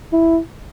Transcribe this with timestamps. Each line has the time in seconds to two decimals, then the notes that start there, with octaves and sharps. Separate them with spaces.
0.12 E4